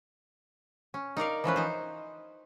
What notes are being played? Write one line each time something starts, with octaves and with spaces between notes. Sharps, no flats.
C#4
D#4 A#4 D5 F5
E3 F3 C#4 B4
D#4 C5